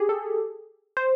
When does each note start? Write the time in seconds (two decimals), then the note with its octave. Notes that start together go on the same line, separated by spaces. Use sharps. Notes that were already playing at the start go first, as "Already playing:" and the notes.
Already playing: G4 G#4
0.09 A4
0.97 C5